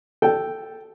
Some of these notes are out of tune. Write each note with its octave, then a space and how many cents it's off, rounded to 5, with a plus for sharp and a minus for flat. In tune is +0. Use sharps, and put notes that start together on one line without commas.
A4 +0 G5 -5